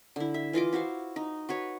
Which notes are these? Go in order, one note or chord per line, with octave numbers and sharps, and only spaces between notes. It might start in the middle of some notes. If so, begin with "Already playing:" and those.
D3 E4
E5
E3 F4 D#5 D6
E4 F#4 C5 F5
D#4
F#4 B4 C#5